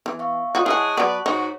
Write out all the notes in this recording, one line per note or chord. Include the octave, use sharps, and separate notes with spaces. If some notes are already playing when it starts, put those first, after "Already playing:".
E3 B3
E5 F5 C#6
F4 F#4 C#5 D#5 D#6
G#3 E4 G#4 F#5 A5 C#6 F#6
F#3 B3 B4 D5
G#2 D#4 F#4 C#5